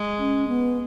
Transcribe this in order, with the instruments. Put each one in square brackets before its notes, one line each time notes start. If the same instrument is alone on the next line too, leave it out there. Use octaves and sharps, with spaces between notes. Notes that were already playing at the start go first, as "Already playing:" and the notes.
Already playing: [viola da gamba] G#3
[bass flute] C#4
B3